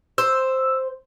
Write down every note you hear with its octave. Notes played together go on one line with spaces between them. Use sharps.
C5 E6